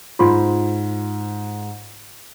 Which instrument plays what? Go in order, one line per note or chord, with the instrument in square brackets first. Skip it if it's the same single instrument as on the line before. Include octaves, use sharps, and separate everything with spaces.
[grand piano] G#2 C5 [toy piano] F4 C6